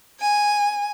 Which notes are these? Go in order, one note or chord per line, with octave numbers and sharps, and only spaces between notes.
G#5